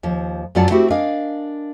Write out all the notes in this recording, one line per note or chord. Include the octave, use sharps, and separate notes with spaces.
D#2 F3
F#2 F#3 F4 D5 F#5 A5
A3 C4 E4 F#4 G4
D4 A#4 D#5 F5 G#5